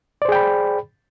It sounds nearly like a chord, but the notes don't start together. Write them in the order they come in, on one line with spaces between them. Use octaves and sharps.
D5 C5 G#4 G5 B5